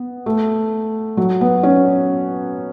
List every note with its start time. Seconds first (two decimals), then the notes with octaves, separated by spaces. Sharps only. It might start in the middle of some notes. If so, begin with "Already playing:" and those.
Already playing: B3
0.26 A3
1.17 F#3
1.41 B3
1.63 C#4